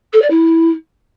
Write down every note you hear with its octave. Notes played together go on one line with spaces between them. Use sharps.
A4
D5
E4